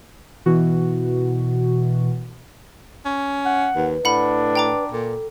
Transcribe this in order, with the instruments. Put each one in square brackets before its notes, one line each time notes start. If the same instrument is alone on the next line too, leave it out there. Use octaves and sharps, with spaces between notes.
[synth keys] B2 E3 F#4
[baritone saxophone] C#4
[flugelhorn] F#5
[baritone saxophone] D#2 [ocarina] B4
[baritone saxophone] A2 [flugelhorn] D4 [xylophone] F#5 B5
[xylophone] G5 A#5 D6
[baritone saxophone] A#2 [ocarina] A4